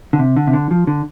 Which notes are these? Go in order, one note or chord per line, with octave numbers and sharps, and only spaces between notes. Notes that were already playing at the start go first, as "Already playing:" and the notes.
D3
C3
D3
C3
D3
F3
D3